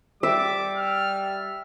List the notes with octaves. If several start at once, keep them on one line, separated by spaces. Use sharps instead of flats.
G3 E5 D6
F6